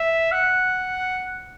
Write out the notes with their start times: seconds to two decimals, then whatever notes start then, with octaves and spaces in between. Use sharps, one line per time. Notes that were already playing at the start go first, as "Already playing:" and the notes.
Already playing: E5
0.32 F#5